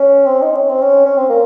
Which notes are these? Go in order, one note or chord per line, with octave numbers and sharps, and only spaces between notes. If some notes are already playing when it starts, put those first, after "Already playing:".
Already playing: C#4
C4
D#4
C#4
C4
C#4
C#4
C4
A#3